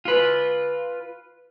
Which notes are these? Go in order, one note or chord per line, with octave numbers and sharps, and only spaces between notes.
F4 B4